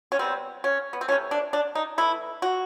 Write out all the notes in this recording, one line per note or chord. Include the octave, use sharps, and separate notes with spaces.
C#4
C3 E3 G3 B3 C4
C#4
B3
C4
C3 E3 A3 C#4
D4
D4
D#4
E3 A3 E4
F#4